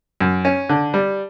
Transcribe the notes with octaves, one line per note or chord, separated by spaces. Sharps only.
F#2
C#4
D3
G3